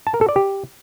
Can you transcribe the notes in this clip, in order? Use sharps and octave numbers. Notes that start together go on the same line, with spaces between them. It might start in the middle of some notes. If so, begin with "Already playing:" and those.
A5
A#4
A4
D5
G4